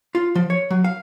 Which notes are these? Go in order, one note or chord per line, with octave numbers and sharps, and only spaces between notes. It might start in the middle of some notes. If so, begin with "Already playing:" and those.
F4
F3
C#5
F#3
F5